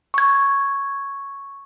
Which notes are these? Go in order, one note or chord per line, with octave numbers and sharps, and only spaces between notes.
C#6 G#6